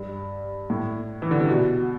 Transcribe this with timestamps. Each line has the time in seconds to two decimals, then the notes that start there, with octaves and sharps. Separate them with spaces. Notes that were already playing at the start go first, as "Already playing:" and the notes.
Already playing: G2
0.70 A2
1.22 E3
1.31 D3
1.40 C3
1.49 B2